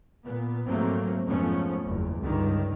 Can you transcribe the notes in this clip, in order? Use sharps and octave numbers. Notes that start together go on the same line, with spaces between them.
A#2 B3
G#2 F3 F#3 A3 A#3 C4
F2 G#2 F3 A3 B3 C#4
F#1 E2
C#2 G2 D3 D#3